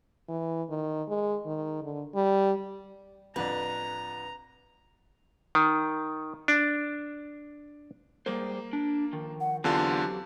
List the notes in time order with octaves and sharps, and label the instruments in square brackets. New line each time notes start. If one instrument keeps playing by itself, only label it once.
[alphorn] E3
D#3
G#3
D#3
D3
G3
[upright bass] D1 A2 [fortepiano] F2 D3 D4 [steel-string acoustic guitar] B4 [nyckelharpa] A#5
[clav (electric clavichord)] D#3
D4
[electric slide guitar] G3 G#3 C5 [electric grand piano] A#3
[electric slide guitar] D4
D#3 F3
[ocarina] F#5
[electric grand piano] E2 D3 F4 [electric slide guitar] F#3 C4 G4 [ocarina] A5